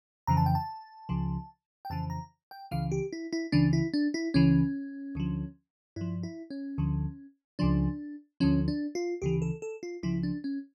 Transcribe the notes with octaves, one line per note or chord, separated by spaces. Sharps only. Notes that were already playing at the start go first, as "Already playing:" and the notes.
F2 C#3 E3 A#5
A5
G5
A5
C#2 C#3 F3
G5
F2 C#3 E3 A5
A#5
G5
C#2 C#3 E3 F5
G4
E4
E4
C#2 C#3 E3 D4
E4
D4
E4
C#2 C#3 E3 C#4
D2 D3 F3
G2 F3 E4
E4
C#4
D2 D3 F3
C#2 C#3 F3 D4
D2 D3 F3 C#4
D4
F4
D2 C#3 E3 G4
A4
A4
F4
C#2 C#3 F3 E4
D4
C#4